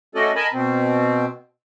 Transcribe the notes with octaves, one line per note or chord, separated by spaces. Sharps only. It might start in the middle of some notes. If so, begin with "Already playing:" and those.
A3 C#4 F#4 A4 D5 D#5
A#4 D#5 G#5 A5 B5
B2 C4